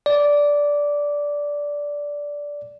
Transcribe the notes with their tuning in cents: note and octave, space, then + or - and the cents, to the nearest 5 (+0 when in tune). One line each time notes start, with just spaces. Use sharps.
D5 -10